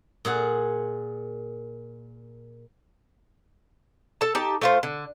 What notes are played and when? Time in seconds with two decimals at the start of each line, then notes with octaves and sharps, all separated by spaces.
0.25 A#2 G#4 F#5
4.21 A4 A5
4.35 D#4 G4 A5
4.62 A3 F4 C5
4.83 D3